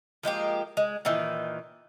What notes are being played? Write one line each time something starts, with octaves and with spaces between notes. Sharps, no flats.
F3 G#3 A#3 G4
G#3
A#2 D#3 E3